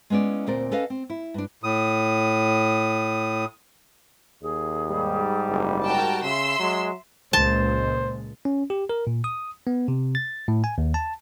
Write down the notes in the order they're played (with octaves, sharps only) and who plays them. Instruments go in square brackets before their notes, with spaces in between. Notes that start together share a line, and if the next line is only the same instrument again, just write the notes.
[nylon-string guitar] G#3 B3 C#4 E4 D5
D2 A#2 C4 A#4 D5
C#4 A4 B4 D#5 F5
C4
E4
G2 D4
[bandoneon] A2 D#6
[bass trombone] D#2 [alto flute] G#4
[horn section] G#2 G3
[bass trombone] F#1
[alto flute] F#4 [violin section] A#4 G5 A5
[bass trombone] C#3 [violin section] E5 C6 E6
[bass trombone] F#3 [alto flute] G#3
[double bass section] C#2 A#2 G#3 [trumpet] C5 [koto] A5
[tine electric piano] C#4
G4
A#4
A#2
D#6
B3
C3
A6
A2
G#5
D#2
A5